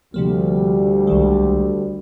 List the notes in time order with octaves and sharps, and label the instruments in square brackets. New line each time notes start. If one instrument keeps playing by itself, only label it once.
[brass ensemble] D2 G3 [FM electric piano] C3 F3 A#3
[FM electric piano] C2 D#3 G#3